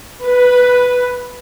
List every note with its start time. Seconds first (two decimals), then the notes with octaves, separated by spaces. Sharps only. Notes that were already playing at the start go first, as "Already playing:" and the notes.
0.24 B4